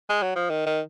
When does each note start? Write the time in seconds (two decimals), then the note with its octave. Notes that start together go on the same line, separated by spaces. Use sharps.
0.10 G#3
0.23 F#3
0.36 F3
0.50 D#3
0.66 D#3